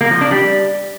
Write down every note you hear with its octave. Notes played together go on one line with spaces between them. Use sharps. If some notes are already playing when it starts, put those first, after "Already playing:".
A#3
F3
D4
G3